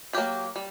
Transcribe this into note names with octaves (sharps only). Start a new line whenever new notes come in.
D#3 F#3 A#3 G4
G3